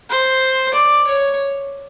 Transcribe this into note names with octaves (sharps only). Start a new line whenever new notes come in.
C5
D5
C#5